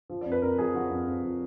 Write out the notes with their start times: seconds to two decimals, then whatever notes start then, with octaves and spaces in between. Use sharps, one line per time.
0.10 F3
0.21 D5
0.26 F2
0.32 B4
0.42 F2 A#4
0.58 F3 G#4
0.74 F3 F#4
0.90 F2
1.07 F2
1.23 F3